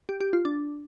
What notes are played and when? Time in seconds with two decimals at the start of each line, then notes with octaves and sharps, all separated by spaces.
0.09 G4
0.20 G4
0.33 F4
0.45 D4